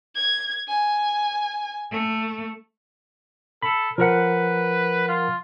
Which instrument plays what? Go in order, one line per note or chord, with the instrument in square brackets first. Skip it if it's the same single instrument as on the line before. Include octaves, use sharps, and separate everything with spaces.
[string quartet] G#6
G#5
A3
[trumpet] A4 [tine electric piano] B5
[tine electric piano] F3 A#4 F#5 [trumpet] B4
[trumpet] F4